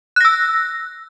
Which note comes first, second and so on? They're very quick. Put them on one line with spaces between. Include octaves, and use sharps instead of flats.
F#6 A#6 E6